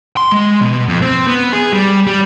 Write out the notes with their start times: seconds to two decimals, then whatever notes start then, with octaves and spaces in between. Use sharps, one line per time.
0.17 C6
0.32 G#3
0.62 B2
0.88 F2
1.02 C4
1.27 B3
1.53 G#4
1.73 G3
2.07 G3